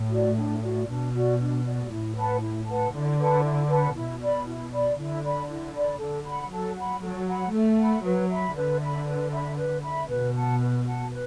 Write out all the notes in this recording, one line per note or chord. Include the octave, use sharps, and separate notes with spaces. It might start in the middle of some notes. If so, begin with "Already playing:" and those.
Already playing: A2
F#4 D5
D4
F#4 D5
B2 D4
F#4 D5
D4
F#4 D5
A2 E4
B4 F#5 A5
E4
B4 F#5 A5
D3 E4
B4 F#5 A5
E4
B4 F#5 A5
B2 E4
D5 B5
E4
D5 B5
D3 E4
D5 B5
E4
D5 B5
D3 A4
F#5 B5
F#3 A4
F#5 B5
F#3 A4
F#5 B5
A3 A4
F#5 B5
F#3 B4
E5 B5
D3 B4
E5 B5
B4
E5 B5
B4
E5 B5
B2 B4
F#5 A5
B4
F#5 A5
B4